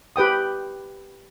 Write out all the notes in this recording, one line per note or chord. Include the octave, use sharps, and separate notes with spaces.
G4 B4 G5 D#6